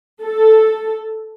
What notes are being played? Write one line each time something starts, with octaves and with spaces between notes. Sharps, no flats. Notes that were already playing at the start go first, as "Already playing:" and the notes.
A4